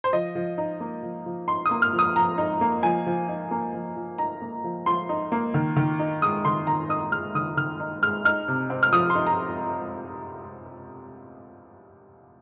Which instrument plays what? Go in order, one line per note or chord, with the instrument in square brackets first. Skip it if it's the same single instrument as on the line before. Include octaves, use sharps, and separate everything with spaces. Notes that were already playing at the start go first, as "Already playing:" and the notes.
[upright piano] C5
F3 D#5
F3
D#4
A#3
F3
F3
D#4 C6
D#6
A#3
F6
F3
D#6
F3 A#5
D#4
A#3
F3 G#5
F3
D#4
A#3
F3
F3
D#4 A#5
A#3
F3
F3 C6
D#4
A#3
D#3
D#3
D#4
G#3 D#6
D#3 C6
D#3 A#5
D#4 D#6
G#3 F6
D#3 D#6
D#3 F6
D#4
G#3 F6
D#4 F6
C3
C4
F6
F3 D#6
C6
D#4
A#5